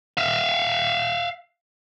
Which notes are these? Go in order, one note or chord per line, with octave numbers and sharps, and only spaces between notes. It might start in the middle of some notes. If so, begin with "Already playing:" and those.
E5 F5